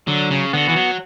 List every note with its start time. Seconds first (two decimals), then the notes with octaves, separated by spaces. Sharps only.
0.08 D3 F#3
0.31 C#3
0.53 D3 B3 F#4
0.69 E3
0.76 F#3